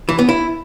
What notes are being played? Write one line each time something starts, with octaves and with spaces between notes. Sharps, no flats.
E3
B3
E4